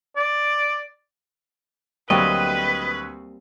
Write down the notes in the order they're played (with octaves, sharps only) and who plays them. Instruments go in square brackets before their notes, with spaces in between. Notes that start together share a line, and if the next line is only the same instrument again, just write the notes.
[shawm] D5
[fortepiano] D2 F#3 C#6 [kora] G3 A#3 C4 [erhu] B4 [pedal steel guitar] D#5